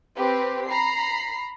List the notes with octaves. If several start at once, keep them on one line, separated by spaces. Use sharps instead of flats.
C4 G4 B4
A#5 B5 C7